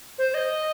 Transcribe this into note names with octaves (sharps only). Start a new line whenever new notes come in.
C5
D#5